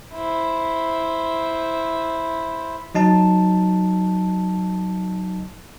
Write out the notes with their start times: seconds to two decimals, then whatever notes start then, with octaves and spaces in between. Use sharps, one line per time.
0.13 E4 C5
2.95 F#3 D#4 A5